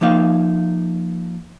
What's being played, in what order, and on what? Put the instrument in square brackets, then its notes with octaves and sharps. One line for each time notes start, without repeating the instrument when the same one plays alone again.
[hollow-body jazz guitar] F3 A#3 D#4 F5